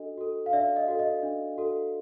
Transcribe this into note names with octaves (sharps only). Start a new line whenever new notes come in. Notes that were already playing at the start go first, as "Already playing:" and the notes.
Already playing: D4 F#4 A4 D#5
F#4 A4
F5
D4 D5 E5
D#5
F#4 A4
D#5
D4
F#4 A4